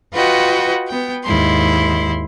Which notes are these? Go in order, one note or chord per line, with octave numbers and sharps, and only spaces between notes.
F4 F#4 B4 D#5 F#5 G5
B3 G5
D#2 G#2 E4 C6